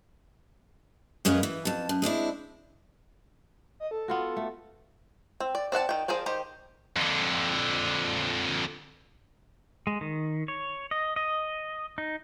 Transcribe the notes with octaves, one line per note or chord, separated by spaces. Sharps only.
F#2 G#3 C#4 A#4 B4 F5
E3
F2 A5
F#2
G#3 C4 D4 E4
D#5
A4
B3 F4 F#4
A3
C4
D5
C4 D5 F#5 A5
D#3 G5
F3 G#4 A#4 C5 D5
D#3 G4 C5
F2 D3
G#3
D#3
C#5
D#5
D#5
D#4